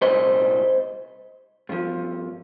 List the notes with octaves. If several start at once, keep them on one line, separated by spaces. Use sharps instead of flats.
C2 A#2 G3 C5 D#5
G2 F3